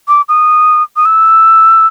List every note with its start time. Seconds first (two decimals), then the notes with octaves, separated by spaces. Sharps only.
0.08 D6
0.29 D#6
0.96 D#6
1.05 E6